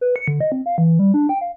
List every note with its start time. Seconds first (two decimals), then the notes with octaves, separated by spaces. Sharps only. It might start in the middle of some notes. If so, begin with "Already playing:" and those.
0.01 B4
0.16 C#7
0.28 D3
0.41 D#5
0.52 C4
0.66 F5
0.78 E3
0.99 G3
1.14 D4
1.29 G5
1.41 F5